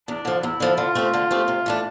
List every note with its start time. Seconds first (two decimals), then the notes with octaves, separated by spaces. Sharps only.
0.08 E2 D4
0.25 D3 F3
0.43 E2 E4
0.60 D3 F3
0.78 D3 F4
0.95 A3 C4 G4
1.13 D3
1.31 A3 C4 G4
1.48 C3
1.66 E3 A3 D4